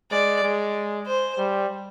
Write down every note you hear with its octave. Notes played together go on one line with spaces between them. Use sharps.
G#3 D5
G#3
C5
G3